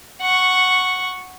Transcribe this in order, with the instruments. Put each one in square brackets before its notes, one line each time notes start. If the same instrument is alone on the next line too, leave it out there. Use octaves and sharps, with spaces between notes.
[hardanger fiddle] F#5 C#6